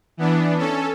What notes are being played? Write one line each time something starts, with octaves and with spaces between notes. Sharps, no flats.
E3 B3 D4
C#4 A4